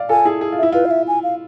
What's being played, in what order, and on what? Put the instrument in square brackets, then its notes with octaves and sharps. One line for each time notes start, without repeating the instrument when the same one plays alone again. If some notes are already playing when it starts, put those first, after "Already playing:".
Already playing: [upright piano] D5 F5
[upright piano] F4 A4 [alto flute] G#5
[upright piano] E4 G#4
G#4
F4
[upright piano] E4 [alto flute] E5
[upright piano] F4 [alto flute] B4
[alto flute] F5
E5
G#5
F5